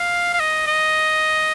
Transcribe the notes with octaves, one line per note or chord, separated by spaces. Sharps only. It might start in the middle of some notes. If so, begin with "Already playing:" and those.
Already playing: F5
F5
D#5
D#5